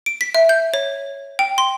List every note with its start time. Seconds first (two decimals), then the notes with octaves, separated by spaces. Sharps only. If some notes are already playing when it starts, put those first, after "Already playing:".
0.06 D7
0.21 B6
0.34 E5
0.49 G6
0.74 C#5
1.39 G5
1.58 C6